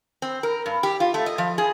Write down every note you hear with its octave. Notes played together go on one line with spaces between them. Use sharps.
C4
A#4
G2
G4
F4
A3
D#5
F3
G#4